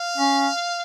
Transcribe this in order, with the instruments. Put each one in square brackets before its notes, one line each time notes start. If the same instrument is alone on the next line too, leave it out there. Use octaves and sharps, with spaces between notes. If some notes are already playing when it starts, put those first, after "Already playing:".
Already playing: [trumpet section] F5
[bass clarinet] C#4